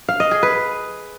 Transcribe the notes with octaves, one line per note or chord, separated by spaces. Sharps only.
F5
D#5
G#4
B4